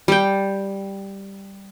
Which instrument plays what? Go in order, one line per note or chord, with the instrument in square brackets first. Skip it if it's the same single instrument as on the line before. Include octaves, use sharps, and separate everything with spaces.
[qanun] G3 G5